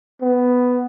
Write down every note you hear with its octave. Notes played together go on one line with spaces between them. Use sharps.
B3